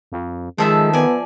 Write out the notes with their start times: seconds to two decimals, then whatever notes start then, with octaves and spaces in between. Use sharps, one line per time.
0.12 F2
0.58 D#3 F3 G#3 A4 E5
0.93 B3 D5 G#5